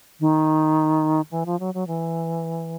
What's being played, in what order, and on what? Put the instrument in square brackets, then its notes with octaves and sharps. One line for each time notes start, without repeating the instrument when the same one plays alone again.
[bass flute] D#3
E3
F3
F#3
F#3
E3